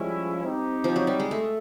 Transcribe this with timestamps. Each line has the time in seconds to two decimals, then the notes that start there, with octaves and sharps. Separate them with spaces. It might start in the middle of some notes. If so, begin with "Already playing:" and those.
Already playing: F3 G3 G#3 C#4 E4
0.43 C4 D#4 G4
0.84 F3
0.96 F#3
1.07 G3
1.20 G#3
1.31 A3